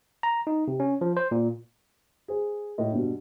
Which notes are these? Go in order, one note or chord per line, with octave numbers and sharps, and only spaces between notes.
A#5
D#4
C3
C#4
F3
C5
A#2
G#4 C5
A2 D#5
G2 B2